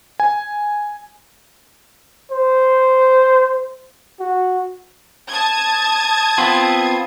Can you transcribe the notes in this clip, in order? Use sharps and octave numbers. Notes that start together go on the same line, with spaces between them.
G#5
C5
F#4
A5 D#6 G#6
B3 C4 F4